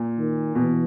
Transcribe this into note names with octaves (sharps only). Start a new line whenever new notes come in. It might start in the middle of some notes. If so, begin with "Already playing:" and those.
Already playing: A#2
D#3
B2 E3